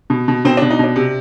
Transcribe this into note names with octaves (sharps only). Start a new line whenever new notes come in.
B2
B2
B2 C4 C5
B2 D4
D#4
B2 D4
C3